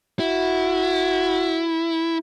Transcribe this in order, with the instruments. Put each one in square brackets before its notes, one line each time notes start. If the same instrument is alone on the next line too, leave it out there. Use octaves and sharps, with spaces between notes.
[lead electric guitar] E4 [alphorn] F#4